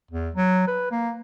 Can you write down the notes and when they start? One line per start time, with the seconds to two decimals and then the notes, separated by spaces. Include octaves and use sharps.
0.11 E2
0.35 F#3
0.67 B4
0.91 A#3